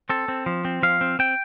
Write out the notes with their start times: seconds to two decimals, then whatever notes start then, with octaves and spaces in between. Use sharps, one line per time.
0.09 C4 A4
0.28 C4
0.46 F3
0.65 C4
0.83 F3 F5
1.01 C4
1.19 C4 G5